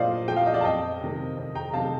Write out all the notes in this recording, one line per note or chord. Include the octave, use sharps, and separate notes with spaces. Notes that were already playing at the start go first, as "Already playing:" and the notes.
Already playing: A#2 F3 C5 D5 D#5 F5
F3 G5
F5
D#5
D5 F5
A5
F2 D#5 G5
C3 D#3
F2
G5 A#5
A#5
C3 D#3 F5 A5